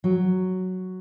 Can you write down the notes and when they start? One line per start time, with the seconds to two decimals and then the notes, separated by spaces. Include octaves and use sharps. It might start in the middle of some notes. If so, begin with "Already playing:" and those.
0.04 F#3